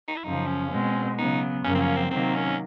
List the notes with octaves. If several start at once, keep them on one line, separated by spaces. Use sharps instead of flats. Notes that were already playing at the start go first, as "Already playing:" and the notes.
D#4
E4
F#2 C#3 F3 D#4
C#4
B2 G#3 C4
C#3 F#3 B3 D#4
F#2 C#3 F3 A#3 C#4
C4
C#4
C4
C3 D#3 F#3 A#3 C4
C#4